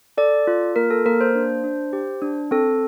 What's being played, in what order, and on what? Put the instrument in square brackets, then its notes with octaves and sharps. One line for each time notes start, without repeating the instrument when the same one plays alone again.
[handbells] A4 D5
F4
A#3 A#4
A4
A#3 A#4
C5
D4
D4
G4
D4
C4 A4